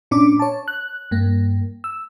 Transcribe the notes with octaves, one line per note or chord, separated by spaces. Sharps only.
A#2 C#4 D4 D6
C#5 A5
F#6
G2 A#3
E6